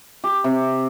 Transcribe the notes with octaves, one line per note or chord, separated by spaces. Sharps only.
G4
C3